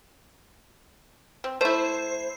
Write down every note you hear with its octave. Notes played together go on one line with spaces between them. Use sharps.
C4
A3 E4 C5